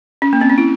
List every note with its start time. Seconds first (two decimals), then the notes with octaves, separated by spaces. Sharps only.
0.22 C#4
0.33 A#3
0.41 C4
0.50 C#4
0.58 E4